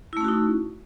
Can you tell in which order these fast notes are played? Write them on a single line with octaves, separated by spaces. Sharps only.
E4 A3 C#4 F#4 D#4